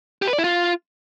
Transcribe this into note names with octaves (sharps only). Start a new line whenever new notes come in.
G4
B4
D5
E4
F4